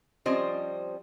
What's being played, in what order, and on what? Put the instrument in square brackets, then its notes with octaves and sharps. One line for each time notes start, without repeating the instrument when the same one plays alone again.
[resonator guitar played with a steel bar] F3 G3 C4 C#4 C5 D#5